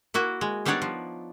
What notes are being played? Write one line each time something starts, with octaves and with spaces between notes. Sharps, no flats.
A#3 E4 F#4
G#3
G3 B3 D4 D#4 C#5 D5
F3